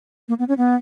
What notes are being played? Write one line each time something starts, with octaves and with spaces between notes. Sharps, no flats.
A#3
B3
C#4
B3